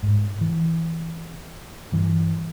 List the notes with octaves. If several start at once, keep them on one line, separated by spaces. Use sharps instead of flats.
G#2
E3
G2 E3